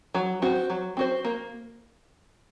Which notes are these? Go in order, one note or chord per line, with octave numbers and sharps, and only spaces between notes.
F#3
C4 F#4 C5
F#3
C4 F#4 C5
A#3